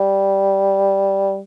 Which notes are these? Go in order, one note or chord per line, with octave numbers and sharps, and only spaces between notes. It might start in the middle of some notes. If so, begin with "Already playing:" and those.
Already playing: G3